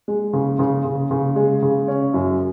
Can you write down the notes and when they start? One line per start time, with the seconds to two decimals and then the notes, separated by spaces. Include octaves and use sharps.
0.08 G#3
0.33 C#3
0.59 C#3
0.85 C#3
1.11 C#3
1.36 G#3
1.62 C#3
1.88 C#4
2.14 F#2